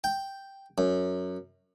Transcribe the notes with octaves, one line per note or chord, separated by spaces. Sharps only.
G5
F#2